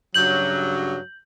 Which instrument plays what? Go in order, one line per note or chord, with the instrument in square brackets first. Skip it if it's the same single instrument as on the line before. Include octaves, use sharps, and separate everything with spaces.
[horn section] G2 C#3 F#3 [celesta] G6 F#7